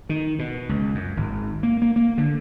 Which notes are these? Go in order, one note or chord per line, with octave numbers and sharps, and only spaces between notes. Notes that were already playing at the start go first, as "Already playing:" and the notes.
D#3
B2
C#2
F#2
G#1
A#3
A#3
A#3
D3